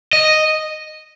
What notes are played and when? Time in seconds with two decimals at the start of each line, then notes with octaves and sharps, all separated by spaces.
0.13 D#5